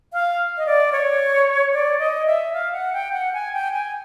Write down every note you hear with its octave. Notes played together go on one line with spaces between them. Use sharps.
F5
D#5
D5
C#5
D5
D#5
E5
F5
F#5
G5
F#5
G#5
G5
G#5